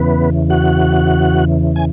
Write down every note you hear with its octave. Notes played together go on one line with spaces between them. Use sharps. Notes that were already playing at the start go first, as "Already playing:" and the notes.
Already playing: E2 C#3 E3 B3 B4
F#4 F#5
G#5